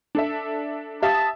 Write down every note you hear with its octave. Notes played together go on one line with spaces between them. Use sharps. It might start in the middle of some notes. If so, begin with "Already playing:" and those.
D4 A4 E5
G4 E5 F5 A5 D#6